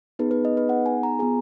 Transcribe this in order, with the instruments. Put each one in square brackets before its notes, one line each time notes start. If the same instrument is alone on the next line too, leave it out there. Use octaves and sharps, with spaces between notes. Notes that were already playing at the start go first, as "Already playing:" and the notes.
[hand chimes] B3 D#4 G#4 B4
B4
D#5
B4
F#5
G#5
A#5
B3 F4 G#4 G#5